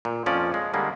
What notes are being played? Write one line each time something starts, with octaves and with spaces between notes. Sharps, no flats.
A#2
F2 F3 C#4 D5
G#3
D3 G3 G#3 A#3